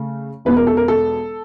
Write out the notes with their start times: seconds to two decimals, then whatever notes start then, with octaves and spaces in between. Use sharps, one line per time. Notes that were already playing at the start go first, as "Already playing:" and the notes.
Already playing: C#3 A3
0.45 E1 E2 B2 B4
0.57 A#4
0.67 A4
0.77 A#4
0.88 A4